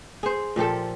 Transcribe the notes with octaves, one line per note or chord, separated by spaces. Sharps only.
G#4 C5
A#2 F3 G4 A4